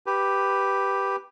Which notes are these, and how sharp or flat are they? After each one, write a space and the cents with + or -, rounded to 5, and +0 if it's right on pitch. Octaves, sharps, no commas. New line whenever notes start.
G4 +0 B4 +0